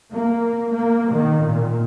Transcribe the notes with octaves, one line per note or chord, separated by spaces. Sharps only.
A#3
A#3
D#3
A#2